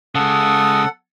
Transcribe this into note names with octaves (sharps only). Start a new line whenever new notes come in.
C#3 G#3 A4 F#5 D#6